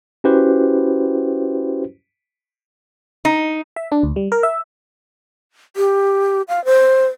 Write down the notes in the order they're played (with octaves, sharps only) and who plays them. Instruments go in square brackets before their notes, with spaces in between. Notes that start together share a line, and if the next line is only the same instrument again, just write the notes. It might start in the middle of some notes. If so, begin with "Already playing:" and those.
[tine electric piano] C#4 E4 F#4 G4 B4 C5
[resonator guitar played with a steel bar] D#4
[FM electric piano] E5
D4
D2
G3
A#4
E5
[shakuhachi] G4
F5
C5